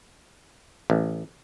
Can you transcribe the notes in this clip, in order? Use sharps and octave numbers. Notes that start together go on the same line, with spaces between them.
A1